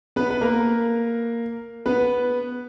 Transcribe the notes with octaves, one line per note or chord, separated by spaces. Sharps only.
B3 B4
B4
A#3 A#4
B3 B4